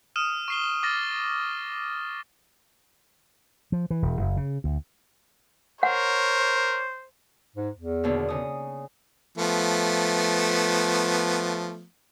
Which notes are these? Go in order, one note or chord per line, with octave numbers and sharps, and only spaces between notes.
D#6 F6 D#7 E7
C#6 C7 G7
D6 F6 A6 A#6
F3
E3
E1
F#1
C#3
D2
A#4 C5 C#5 F#5
G#2
E2
D#2 B2 D3
C#3 D#6
F3 A3 B3